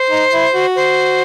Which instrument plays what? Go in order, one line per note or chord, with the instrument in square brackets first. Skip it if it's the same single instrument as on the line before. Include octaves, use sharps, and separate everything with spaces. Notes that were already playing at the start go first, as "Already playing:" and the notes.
Already playing: [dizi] C5
[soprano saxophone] D#4
E4
F#4
[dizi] C5